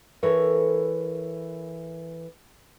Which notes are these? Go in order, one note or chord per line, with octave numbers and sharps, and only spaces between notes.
E3 A4 A#4 C#5